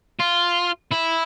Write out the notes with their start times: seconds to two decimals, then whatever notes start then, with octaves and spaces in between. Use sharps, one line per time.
0.19 F4
0.92 E4